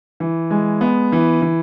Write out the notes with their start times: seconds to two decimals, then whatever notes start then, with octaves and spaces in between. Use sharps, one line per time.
0.20 E3
0.51 G#3
0.81 B3
1.12 E3
1.42 E3